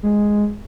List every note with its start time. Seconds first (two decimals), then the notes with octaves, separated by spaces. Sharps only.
0.03 G#3